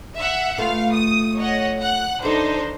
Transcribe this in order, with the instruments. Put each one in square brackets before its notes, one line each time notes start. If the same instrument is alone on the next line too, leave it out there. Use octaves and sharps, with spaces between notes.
[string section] E5 F#5
[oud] A3 B3 F4 [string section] F5
[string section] D#6
C#5 D#5 F#5
F#5 F#6
[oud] E3 A4 [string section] D4 D#4 C5